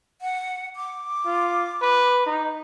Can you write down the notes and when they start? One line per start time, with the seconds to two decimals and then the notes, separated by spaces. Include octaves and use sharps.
0.22 F#5
0.76 D6
1.26 F4
1.82 B4
2.26 D#4